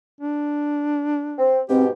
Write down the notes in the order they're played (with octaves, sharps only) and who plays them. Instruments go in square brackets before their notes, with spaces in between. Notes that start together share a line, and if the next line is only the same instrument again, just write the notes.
[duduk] D4
[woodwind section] C4
[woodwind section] G#2 B2 [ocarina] C4 [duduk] G4